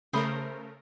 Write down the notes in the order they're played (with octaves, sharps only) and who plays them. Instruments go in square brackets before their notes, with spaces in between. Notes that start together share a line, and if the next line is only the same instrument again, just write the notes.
[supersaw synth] C#3 A3 A#4 [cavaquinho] C5 B5 D#6